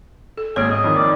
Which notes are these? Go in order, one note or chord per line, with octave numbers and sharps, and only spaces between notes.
A4
G#1 A#3 G#4 C#5
D#5
F2 D#3
D5